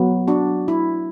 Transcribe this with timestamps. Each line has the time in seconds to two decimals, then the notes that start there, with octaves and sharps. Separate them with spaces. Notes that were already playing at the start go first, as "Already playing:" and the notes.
Already playing: F#3 B3
0.28 D4 F#4
0.68 E4